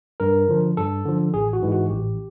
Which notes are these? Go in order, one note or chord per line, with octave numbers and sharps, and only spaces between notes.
G2 A#4
D3 F3
G2 A4
D3 F3
A1 G#4
F#4
G#2 E3 G#3
F#4
A1 G4